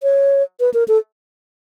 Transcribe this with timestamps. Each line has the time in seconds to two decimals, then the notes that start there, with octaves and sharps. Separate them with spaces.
0.03 C#5
0.60 B4
0.74 A#4
0.88 A4